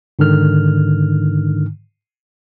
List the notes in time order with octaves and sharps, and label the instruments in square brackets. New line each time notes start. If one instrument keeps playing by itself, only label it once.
[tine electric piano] G#2 D3 D#3 F6